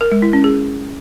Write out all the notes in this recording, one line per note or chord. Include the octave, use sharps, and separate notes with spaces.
A#4
G#3
E4
C#4
G#4